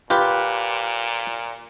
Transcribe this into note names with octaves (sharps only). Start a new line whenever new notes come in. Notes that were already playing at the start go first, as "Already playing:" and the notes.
A#2 F4 G4 B4